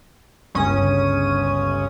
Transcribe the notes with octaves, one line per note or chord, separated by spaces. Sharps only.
G1 C#2 C#4 D#6